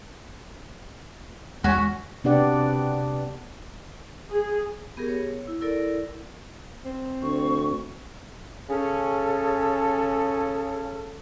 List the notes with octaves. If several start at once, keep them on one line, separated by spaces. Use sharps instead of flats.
E2 G#3 C#4 F#4 G#5
C3 B3 D4 G4 D5 F#5
G#4
B3 G4 G#4 A#4
C#5
E4
E4 A4 A#4 D5
C4
D2 C#6
C#3 C#4 G#4 A4